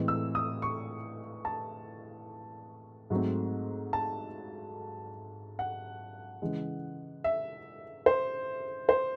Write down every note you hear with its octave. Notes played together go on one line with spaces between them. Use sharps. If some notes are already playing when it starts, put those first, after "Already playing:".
Already playing: A2 E3 G#3 C4
E6
D#6
C#6
A5
G#2 F#3 A3 C4
A5
F#5
C#3 E3 G#3
E5
C5
C5